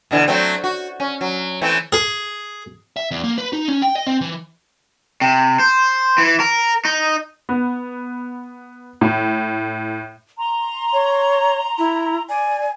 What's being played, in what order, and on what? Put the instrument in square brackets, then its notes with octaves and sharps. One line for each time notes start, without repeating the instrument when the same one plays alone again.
[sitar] B2 D3 E3
F#3 A3 C4
F#4
C#4
F#3
E3 A3 C4
[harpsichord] G#4
[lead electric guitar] E5
E2
A#3
B4
D#4
C#4
G5
D#5
C4
E3
[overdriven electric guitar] C3
C5
E3
A#4
D#4
[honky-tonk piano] B3
A2
[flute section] A#5 C6
[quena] C#5
E4
[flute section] D5 [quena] G#5